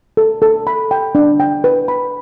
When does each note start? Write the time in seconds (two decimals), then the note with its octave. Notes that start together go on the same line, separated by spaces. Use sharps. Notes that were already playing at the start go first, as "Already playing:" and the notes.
0.17 A4
0.42 A4
0.67 B5
0.91 G5
1.15 D4
1.40 G5
1.64 B4
1.88 B5